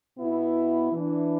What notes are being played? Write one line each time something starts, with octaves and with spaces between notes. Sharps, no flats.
B2 B3 E4
E3 D4